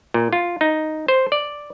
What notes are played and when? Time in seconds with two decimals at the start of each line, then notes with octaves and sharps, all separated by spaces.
0.14 A#2
0.33 F4
0.61 D#4
1.08 C5
1.32 D5